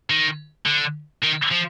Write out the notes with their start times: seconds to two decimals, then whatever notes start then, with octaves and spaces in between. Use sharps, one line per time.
0.10 D#3
0.66 D3
1.23 D#3
1.51 F3